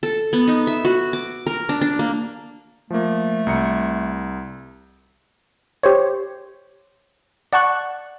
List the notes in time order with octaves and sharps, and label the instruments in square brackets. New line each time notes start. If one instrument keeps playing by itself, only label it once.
[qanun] A4
B3
D#4
E5
F#4
D6
A#4
D4
D4
A#3
[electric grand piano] F3 A#3 [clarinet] A3
[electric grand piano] C2 A#5 C#7
[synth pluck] G4 C5 C#5
D5 F#5 A5 C#6 F#6